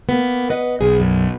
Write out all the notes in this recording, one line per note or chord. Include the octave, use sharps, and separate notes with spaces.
A#3 B3
B4 D#5 F#5
B1 G#4
F#2